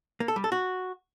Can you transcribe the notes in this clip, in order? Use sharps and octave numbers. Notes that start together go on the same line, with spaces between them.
A#3
A4
G3
A4
F#4